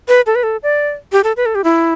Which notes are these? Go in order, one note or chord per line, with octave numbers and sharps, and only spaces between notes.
B4
A4
B4
A4
D5
G4
A4
B4
A4
G4
E4